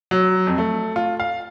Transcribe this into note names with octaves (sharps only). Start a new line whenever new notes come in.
F#3
F2
A3
F4
F5